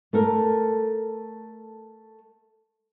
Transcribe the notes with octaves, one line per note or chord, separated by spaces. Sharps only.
A3 A4 A#4